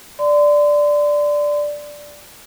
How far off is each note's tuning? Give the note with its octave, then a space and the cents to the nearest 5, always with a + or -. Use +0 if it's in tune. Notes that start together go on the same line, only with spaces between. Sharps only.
D5 +0 C6 -35